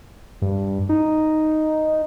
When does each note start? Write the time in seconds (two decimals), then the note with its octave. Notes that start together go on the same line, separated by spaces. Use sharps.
0.42 G2
0.89 D#4